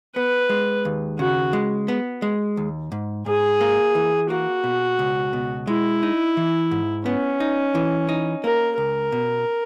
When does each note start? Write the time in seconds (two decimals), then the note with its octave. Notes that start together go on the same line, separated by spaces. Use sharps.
0.15 B3 B4
0.49 G#3
0.85 D#2
1.19 C#3 F#4
1.53 G#3
1.88 B3
2.22 G#3
2.57 D#2
2.92 G#2
3.26 G#2 G#4
3.61 A#3
3.95 E3
4.30 A#3 F#4
4.64 B2
4.99 C#2
5.33 B2
5.67 G#3 E4
6.03 D#4
6.37 E3
6.71 G#2
7.06 B3 C#4
7.40 D#4
7.75 E3
8.09 D#4
8.44 A#3 A#4
8.78 C#2 A#4
9.12 B2